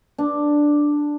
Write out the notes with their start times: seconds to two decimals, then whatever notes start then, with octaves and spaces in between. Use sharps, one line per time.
0.18 D4